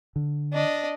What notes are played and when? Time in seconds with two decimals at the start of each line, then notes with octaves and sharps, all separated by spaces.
0.16 D3
0.53 D4 D#5